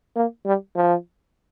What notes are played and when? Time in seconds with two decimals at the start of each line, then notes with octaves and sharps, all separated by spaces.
0.16 A#3
0.46 G3
0.76 F3